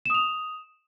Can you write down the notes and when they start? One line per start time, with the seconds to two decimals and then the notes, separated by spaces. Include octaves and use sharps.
0.06 E7
0.10 D#6
0.14 F7